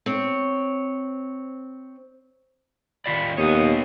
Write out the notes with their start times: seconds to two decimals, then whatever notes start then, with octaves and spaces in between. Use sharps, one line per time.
0.06 C4 C#5
3.06 D#3 F4 D5 B5
3.37 D#2 B3 C#5 D#6